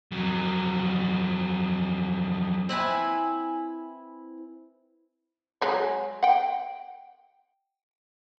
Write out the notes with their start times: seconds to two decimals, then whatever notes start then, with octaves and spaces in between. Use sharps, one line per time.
0.11 F2 F#3
2.69 C4 E4 B4 G#5
5.61 F#3 G#3 C#5
6.23 F#5 G5